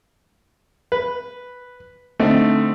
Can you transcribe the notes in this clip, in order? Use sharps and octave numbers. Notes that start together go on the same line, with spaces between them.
B4
D3 A3 C4 D#4